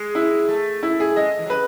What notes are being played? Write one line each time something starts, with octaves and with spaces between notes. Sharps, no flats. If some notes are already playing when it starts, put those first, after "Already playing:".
Already playing: G#3
E4
A3
E4
G#4
G#3 D#5
E3
F#3
B4